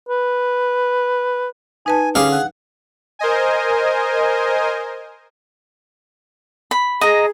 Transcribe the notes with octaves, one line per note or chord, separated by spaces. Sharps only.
B4
D#4 B4 G#5 A5
D3 C#4 G4 G#4 F5
F#5
A#4 C5 D#5 G#5
B5
G#4 D#5 A#5